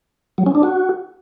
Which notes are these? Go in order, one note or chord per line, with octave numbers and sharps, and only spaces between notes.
F#3
C#4
D4
F#4